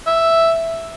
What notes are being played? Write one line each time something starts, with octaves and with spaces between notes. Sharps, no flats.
E5